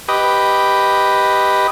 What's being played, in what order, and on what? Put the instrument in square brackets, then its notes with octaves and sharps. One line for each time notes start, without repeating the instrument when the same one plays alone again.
[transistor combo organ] G4 B4 D#5